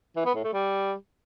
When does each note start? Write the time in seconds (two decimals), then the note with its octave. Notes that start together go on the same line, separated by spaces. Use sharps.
0.16 E3
0.25 B3
0.35 A2
0.44 A3
0.53 G3